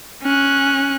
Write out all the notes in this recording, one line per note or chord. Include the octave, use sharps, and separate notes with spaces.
C#4 F#6